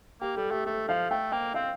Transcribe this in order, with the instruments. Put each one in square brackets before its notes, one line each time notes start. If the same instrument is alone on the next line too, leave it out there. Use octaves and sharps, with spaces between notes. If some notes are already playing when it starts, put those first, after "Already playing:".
[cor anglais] A#3 [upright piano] G4
[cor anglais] G3 [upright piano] A4
[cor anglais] A3 [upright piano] G4
[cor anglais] A3 [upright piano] A4
[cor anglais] F3 [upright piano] F5
[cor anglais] A3 [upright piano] G5
[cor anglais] A#3 [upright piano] G5
[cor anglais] C4 [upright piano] F5